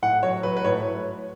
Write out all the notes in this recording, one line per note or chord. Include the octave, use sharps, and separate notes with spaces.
A2 F#5
F#3 C#5
F#3 B4
B4
A2 C#5